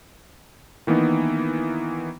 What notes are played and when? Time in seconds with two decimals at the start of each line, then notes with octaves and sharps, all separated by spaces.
0.87 D#3 E3 A#3 B3 D#4